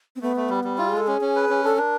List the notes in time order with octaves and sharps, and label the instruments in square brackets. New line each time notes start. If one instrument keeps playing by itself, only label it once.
[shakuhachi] C4
[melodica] A3 [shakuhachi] B3
[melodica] A3
G3
G3
[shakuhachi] E4 [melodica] F4
[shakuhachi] G#4
[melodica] G#3 [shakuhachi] A4
[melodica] C#4 [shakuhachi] G#4
[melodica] C#4
B4
C#4
[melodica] D4 [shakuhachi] A4
[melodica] D4 [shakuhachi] A#4